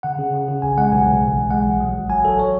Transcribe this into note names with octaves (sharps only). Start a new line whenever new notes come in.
C#3 F#5
C#3
C#3
C#3
B1 G#5
G#3 F#5
B1 G#5
B1
A1
A1
G#3 F#5
A1
F#3
G#1
F#3 G#5
F#3 A4
C#5